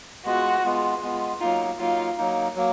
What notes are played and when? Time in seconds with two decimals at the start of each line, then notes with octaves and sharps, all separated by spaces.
0.25 G#3 B3 F4 F#4
0.64 G#3 B3 F4
1.02 G#3 B3 F4
1.40 F#3 A#3 D#4 F4
1.79 F#3 A#3 D#4 F4
2.18 F#3 A#3 D#4
2.55 F#3 A#3